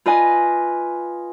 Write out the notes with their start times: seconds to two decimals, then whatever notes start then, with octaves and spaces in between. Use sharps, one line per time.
0.06 F4 B4 D#5 G#5